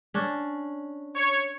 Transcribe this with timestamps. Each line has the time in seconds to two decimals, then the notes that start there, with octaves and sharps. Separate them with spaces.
0.14 C#4 D4
1.16 C#5